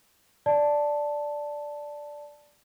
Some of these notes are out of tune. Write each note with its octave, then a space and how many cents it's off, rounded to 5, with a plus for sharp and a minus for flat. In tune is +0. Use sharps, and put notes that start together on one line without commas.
D5 +0 A5 +0